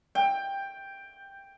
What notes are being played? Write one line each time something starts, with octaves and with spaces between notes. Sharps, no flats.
G5